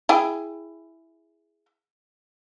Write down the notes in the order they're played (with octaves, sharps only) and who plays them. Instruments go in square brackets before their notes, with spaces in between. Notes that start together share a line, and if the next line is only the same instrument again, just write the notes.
[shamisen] E4 G#4 G5